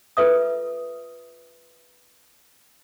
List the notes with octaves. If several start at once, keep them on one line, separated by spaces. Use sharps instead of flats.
F4 A4 B4 E5 D#6